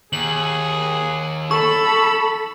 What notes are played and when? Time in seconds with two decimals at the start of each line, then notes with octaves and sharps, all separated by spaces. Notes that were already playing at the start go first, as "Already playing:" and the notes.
0.13 D#2 G#4 F#7
1.51 A4 B5 C#6 E6